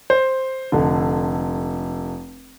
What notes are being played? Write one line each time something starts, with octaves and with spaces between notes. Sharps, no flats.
C5
F1 D3